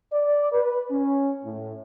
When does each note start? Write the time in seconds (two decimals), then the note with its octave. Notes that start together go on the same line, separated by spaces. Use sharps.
0.12 D5
0.52 B4
0.90 C#4
1.44 A2